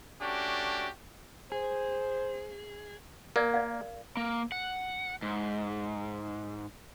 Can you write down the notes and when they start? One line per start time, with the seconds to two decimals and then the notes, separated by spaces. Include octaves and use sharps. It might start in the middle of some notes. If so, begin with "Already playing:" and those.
0.22 A3 C#4 D4 F#4 G4
1.52 G#4 C5
3.36 A#3 A#4 D5
3.54 D5 F5
4.17 A#3
4.52 F#5
5.22 G#2